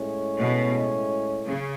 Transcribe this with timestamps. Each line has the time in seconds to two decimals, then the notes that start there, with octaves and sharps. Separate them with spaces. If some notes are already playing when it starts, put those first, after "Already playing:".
Already playing: A2 G#3 C#4
0.38 B2
1.46 C#3